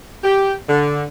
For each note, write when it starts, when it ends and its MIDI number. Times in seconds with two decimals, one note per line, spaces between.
0.24 0.55 67
0.69 1.04 50